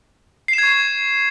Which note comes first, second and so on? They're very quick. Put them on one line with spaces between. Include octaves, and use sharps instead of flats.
C7 E7 G#6 C#6